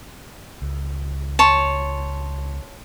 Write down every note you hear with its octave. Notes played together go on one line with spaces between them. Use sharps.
C#2
C#5 A5 C6